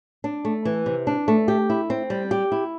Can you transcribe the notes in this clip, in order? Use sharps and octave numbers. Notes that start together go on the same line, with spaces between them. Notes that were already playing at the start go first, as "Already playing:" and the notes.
D4
A3
E3
C3
D4
A3
G4
E4
C4
G3
G4
E4